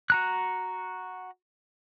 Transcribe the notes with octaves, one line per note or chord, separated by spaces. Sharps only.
F#4 A#5 F#6